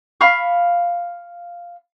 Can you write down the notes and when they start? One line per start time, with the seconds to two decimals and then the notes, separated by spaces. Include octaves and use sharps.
0.21 F5 B5 C#6